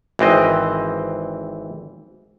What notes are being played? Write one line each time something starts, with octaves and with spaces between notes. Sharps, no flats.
G#1 E3 C4 D#5